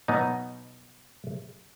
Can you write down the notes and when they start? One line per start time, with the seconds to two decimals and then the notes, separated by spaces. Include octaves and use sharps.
0.08 B2 F#3 B3 D#4